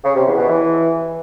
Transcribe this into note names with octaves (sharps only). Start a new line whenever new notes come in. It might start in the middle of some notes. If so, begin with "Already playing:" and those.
C#3
C3
E2
B2
E3